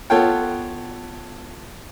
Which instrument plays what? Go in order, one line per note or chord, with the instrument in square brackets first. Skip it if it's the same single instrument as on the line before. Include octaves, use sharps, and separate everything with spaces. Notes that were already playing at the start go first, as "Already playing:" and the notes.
[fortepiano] B3 F4 A4 C#5 F#5 G5